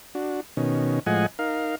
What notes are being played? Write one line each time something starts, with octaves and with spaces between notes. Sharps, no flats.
D4 F#4
B2 D#3 C#4
A2 F3 G#3 D#5 F#5 G#5
D#4 A#4 F5